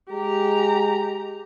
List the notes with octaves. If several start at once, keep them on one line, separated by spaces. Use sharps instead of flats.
G#3 G4 A#5